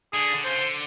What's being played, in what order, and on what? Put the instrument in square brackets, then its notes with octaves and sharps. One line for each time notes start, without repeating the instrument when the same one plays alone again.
[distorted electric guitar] D3 [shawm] G#4
[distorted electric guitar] D3
[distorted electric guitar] C#3 [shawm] C5
[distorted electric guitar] D3